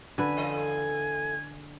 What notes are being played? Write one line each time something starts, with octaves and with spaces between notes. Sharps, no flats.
D3 B4 G#5
E3 A4 D#5